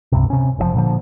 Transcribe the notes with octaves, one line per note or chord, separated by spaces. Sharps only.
E1 C#2 G2 C3
C3 C#4
F#1 C3 F3
A#2 D3 D#3 F3